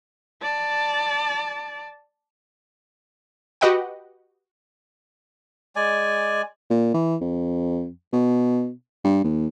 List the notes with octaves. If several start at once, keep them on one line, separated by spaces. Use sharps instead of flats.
D5 A5
F#4 G4 B4 D#5 F#5 G5
G#3 D5 G#5
A#2
E3
F2
B2
G2
D#2